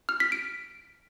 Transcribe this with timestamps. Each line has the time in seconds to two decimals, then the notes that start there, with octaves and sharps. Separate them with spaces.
0.09 F6
0.20 B6
0.32 D7